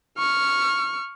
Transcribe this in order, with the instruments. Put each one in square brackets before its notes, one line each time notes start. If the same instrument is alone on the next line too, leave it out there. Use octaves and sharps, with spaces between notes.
[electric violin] C#6 F6